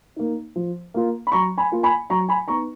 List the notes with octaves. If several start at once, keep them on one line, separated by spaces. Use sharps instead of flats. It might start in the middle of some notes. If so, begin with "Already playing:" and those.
A#3 D#4
F3
A#3 F4
B5
F#3 A#5 C#6
G#5 B5
A#3 F4
G#5 B5
F#3 A#5 C#6
G#5 B5
B3 D#4 A#5 C#6